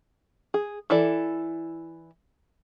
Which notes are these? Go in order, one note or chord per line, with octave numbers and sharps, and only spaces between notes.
G#4
E3 E4 A4 D5